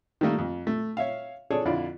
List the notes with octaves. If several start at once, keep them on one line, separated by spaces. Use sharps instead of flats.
D#3 G3 A3 A#3
F2
A3
C#5 E5 F5
D4 G#4 A4 C#5 D5
F2 D3 E4 F4 D5